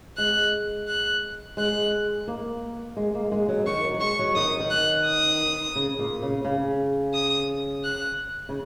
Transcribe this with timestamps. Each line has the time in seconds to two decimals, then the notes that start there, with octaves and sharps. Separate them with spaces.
0.18 G#3 F#6
0.88 F#6
1.57 G#3 F#6
2.28 A#3
2.97 G#3
3.15 A#3
3.32 G#3
3.48 F#3
3.67 D#3 C#6
3.84 F#3
3.94 F#3
4.01 G#3 C#6
4.19 F#3
4.35 D#3 D#6
4.48 F#3
4.60 D#3
4.70 F#6
5.06 D#6
5.76 C#3
5.99 A#2
6.22 C#3
6.45 C#3
7.14 D#6
7.84 F#6
8.49 C#3